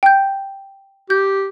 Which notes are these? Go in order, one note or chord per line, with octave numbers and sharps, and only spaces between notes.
G5 G6
G4 G6